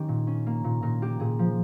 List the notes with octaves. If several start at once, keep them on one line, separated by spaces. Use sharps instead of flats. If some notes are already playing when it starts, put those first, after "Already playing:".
Already playing: D#3 C#4 G4 A#4
A#2
C#4
A#3
A#2
A#2 A#4
A#3 G4
A#2 G#4
F3